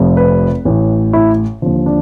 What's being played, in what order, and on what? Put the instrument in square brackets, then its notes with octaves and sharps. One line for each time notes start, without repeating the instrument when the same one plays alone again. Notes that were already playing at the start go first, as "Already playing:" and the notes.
Already playing: [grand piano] F1 F2 C3 F3
B4
A1 A2 E3
E4
D#2 D3 F3
D4